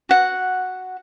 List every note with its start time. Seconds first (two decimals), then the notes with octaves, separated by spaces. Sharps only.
0.09 F#4 F#5